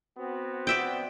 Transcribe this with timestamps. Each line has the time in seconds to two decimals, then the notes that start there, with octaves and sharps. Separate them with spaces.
0.18 B3 C4 F#4
0.67 D5 E5 G5